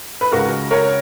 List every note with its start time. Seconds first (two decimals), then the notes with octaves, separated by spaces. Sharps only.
0.21 B4
0.32 C#2 C#3 G#3 F#4 A#4
0.71 A#4 C#5